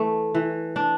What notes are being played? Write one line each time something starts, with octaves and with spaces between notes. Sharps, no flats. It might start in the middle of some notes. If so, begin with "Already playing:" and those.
Already playing: E3 A3
E3
D4